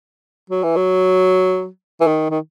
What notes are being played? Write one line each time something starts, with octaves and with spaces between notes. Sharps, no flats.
F#3
E3
F#3
E3
D#3
D#3